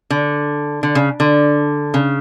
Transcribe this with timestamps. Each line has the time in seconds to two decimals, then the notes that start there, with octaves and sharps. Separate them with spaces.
0.10 D3
0.83 D3
0.95 C#3
1.20 D3
1.94 C#3